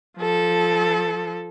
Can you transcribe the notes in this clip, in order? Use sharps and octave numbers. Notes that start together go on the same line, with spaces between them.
F3 A4